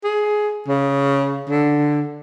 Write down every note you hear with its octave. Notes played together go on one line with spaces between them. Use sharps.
G#4
C#3
D3